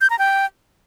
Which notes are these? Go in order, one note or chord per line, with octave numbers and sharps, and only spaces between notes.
G6
A#5
G5